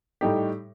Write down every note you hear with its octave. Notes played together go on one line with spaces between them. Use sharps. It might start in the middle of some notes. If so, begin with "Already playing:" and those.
A2 G3 D#4 G4